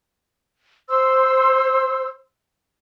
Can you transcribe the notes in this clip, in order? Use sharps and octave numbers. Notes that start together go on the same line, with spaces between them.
C5 C6 E6